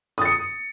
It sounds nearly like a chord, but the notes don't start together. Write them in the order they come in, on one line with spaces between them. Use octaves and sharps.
D#6 A6 C#7